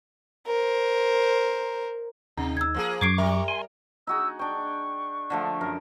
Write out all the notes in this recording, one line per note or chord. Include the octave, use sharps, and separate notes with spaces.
A#4 C5
D#2 C3 D#4
E6 G#6
F3 A#3 G#4
F#2 C#6 D6 G#6 C7 D7
G3 A#4 E5
G#5 C6
D#4 F#4 G#4 E6
D4 G5 C#6
D3 F3 A3
F#2 A#4